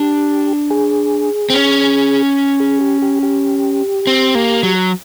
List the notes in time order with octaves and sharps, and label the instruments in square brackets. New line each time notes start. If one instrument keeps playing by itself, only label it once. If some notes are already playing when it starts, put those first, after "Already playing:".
Already playing: [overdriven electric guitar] D4 [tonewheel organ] G4
[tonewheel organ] G#4
[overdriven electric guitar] C4
C#4
[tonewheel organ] G#4
G4
G4
G4
[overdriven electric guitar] C4
A#3
F#3